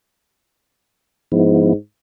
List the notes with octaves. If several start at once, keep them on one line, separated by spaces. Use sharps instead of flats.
G#2 F3 B3 E4